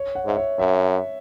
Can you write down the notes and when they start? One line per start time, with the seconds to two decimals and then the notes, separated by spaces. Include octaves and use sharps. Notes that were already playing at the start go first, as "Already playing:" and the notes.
Already playing: C#5
0.15 F#5
0.26 G#2 E5
0.37 C#5
0.59 F#2 E5